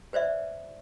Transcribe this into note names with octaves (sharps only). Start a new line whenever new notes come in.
B4 C5 D5 E5